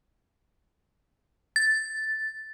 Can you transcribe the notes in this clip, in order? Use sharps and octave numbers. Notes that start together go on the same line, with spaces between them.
A6